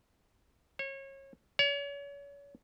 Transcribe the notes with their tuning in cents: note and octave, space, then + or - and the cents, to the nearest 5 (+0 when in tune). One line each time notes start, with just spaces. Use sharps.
C#5 -30
C#5 +35